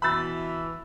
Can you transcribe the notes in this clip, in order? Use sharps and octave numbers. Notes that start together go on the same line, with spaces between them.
B2 E3 B5 E6 A6